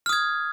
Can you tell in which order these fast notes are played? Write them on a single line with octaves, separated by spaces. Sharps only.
F6 D#6 G#6